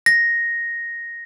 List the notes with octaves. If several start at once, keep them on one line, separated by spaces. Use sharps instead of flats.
A#6